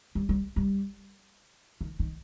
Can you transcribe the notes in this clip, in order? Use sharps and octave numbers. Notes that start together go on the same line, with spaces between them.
G3
G3
G3
D#3
D#3